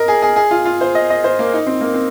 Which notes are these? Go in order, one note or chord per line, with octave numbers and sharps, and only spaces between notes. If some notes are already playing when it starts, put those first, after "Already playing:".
Already playing: A#4 D#5
G#4
G#4
G#4
F4
F4
C5
D#5
D#5
C5
A#3
D#4
C4
A#3
C4